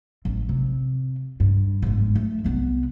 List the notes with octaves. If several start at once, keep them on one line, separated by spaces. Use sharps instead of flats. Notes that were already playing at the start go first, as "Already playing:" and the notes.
A1
C3
G2
G1 G#2
A3
C2 B3